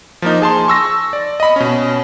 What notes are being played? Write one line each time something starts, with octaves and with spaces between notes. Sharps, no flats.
F3 A#3 D#4
G#4 A5 C6
C#6 E6 A#6
D5
D#5 B5
B2 C#4